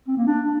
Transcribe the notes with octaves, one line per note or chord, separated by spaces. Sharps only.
C4
A#3
D4